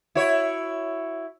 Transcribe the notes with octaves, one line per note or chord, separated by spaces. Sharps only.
E4 F#4 C#5